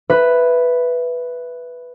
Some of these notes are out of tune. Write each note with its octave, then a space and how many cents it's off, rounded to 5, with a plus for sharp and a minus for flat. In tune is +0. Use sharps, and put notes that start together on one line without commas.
B4 +0 E5 +10